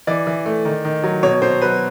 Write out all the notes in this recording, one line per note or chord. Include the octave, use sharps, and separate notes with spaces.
E3 D5
E3
A3
D#3
D#3
F#3
B2 C#5
B2 C5
F#3 B4